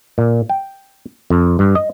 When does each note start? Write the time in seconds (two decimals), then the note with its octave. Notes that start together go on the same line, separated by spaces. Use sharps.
0.18 A#2
0.50 G5
1.30 F2
1.59 G2
1.75 D#5